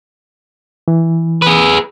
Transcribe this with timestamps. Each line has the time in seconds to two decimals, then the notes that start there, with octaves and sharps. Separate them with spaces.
0.88 E3
1.42 G#4 B4